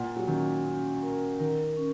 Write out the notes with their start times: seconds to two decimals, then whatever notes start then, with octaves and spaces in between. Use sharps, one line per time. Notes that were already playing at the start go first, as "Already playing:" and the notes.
Already playing: A#2 F#5
0.17 F#3
0.27 D#3 C#4
0.65 C#4
1.03 A#4
1.40 D#3 A#4
1.77 C#4